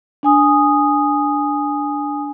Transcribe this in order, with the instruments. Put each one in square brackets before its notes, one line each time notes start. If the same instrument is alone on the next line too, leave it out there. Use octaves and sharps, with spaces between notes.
[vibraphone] D4 G#5 D#6